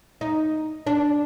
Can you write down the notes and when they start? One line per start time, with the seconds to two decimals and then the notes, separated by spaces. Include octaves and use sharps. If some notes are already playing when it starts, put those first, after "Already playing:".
0.21 D#4
0.87 D4